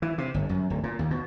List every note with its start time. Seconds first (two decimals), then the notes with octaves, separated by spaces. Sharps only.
0.02 E3
0.18 C3
0.34 G1
0.49 F#2
0.70 D1
0.84 A#2
0.99 D#2
1.11 B2